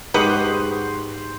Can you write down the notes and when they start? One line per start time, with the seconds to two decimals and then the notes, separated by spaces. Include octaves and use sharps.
0.14 G#2 G4 B4 C5 D#5 F#5 C#6